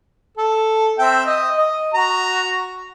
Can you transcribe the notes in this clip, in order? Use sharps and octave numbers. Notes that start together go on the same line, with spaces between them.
A4
C4 E5 G5
D#5
D#5
F#4 A#5